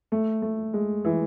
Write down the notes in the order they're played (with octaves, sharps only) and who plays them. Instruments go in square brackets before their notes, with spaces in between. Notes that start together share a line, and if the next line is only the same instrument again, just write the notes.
[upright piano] A3
A3
G#3
E3